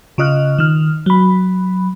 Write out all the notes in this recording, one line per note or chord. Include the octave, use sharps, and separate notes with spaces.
C#3 F4 D#5 F6 F#6
D#3 F6
F#3 B5